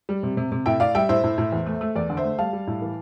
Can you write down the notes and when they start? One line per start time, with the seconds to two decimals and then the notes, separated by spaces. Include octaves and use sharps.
0.09 G3
0.23 C3
0.37 C3
0.52 C3
0.66 A2 E5 G5
0.80 A2 D5 F5
0.95 G3 E5 G5
1.09 A2 C5 E5
1.24 A2
1.38 A2
1.52 E2
1.67 A3
1.81 A3
1.96 E2 D5
2.10 D3
2.17 C5 E5
2.24 A3
2.39 G3 F5 A5
2.53 G3
2.67 A2
2.82 E3